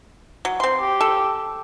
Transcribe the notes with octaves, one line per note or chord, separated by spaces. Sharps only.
F#3
C4 C6
G4
A4